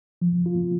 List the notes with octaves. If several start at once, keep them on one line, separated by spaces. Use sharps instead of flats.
F3
F4